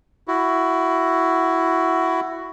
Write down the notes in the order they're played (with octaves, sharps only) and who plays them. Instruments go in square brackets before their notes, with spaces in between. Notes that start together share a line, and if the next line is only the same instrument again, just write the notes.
[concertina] E4 F#4